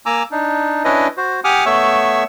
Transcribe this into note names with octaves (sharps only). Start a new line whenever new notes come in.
A#3 G#5 A#5 D6 E6
D4 D#4
C#4 D4 E4 B4 D#5
F#4 C5
G4 F#5 G#5 D6 D#6 F6
A3 B3 C#5 E5 C#6 E6